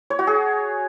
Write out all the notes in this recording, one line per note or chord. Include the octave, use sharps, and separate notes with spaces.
C#5
F#4
G#4